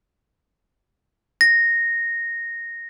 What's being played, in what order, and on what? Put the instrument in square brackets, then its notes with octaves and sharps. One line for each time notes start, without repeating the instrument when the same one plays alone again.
[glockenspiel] A#6